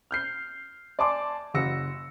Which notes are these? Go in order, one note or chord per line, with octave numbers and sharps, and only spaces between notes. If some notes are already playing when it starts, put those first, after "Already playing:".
F6 G6 C7
D5 G#5 A5 C6 D6
F#1 C#3 F#4 E6 A#6 C#7